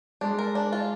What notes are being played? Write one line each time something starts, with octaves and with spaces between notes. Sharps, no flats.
G#3 D4
A#4
D4
F4